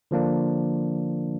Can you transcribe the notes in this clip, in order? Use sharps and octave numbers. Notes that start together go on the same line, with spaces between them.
D3 F3 A#3 D4